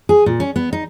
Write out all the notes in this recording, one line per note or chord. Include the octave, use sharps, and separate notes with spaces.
G#4
A#2
C#4
B3
D#4